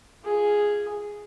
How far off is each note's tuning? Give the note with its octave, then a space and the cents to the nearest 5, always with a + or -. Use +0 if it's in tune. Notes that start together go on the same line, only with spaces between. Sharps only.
F4 -15 G#4 +0